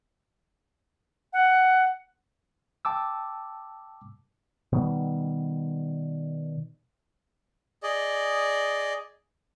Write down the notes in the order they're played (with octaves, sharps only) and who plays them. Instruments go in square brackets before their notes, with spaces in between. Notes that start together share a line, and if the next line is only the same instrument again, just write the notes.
[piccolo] F#5
[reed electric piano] G5 A5 D6 E6
[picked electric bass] B2 D#3 G3
[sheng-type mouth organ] G#4 D5 D#5